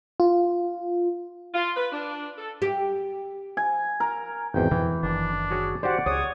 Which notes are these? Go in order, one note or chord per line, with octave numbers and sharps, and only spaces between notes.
F4
F4
B4
D4
A4
G4
G#5
A#4
G#1 E2 G5
F2 B2 D#3 E3
F#1 D#3 D4
F#4 G#4 C#5
F#4 G4 C5 D5 F#5
C#2 G#4 C#5 D#6